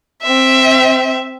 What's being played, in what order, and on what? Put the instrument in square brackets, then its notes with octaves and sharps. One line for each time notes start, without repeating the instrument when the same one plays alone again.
[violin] C4 E5